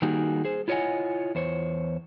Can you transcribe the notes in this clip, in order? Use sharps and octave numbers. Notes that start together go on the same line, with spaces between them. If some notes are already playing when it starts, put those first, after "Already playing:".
D#3 G3 A#3 D#4 F#4 G#4
G#4 C5
E4 F4 C#5 D#5 F#5 G#5
E2 C5 C#5